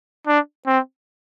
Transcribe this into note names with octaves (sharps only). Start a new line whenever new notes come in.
D4
C4